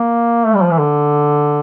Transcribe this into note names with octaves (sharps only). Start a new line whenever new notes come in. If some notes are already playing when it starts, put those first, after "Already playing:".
Already playing: A#3
A3
G3
F3
E3
D3